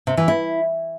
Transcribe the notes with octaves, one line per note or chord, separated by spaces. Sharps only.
C3
E3
E4